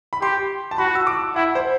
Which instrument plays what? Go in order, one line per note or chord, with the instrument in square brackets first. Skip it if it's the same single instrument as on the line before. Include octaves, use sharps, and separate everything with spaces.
[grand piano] B5
[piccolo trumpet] G4 [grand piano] C6
[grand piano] A5
[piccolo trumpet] F#4 [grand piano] B5
[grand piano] E6
D6
[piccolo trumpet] E4 [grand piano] F#5
[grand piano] C5